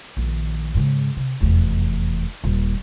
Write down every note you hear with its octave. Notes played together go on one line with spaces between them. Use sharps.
A#1 D#3
G#2 C#3
C3
F1 E2
D#1 A#2